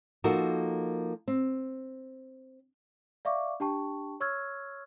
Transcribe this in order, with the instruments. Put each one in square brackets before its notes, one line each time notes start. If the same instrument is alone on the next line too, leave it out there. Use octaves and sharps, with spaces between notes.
[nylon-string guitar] F3 A#3 D#4 F#4 A4 A#4
C4
[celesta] D5 E5 F5 C#6 D6
D4 G4 G5 A5 C#6
C#5 C#6 E6 F6 G#6